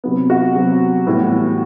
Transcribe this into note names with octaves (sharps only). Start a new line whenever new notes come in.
C3 F#3 B3
F#4
C3 F#3 B3
A2 E3 G3 B3